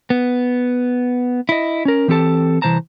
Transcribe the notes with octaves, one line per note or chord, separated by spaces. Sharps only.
B3
E4 D#5
C#4 A#4
E3 C4 G4 A4 A5
C2 E3 F3 C5 A5 A#5